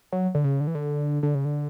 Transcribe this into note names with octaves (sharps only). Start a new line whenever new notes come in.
F#3
D3
C#3
D3
E3
D3
D3
C#3
D3